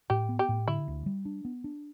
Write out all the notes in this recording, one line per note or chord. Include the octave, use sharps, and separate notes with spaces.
A2 G4
B3
G4
A2
D3 E4
D2
G3
D4
B3
D4